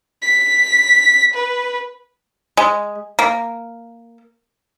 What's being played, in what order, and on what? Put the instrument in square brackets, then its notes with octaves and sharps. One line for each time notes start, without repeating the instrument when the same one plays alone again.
[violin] B6
B4
[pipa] G#3
A#3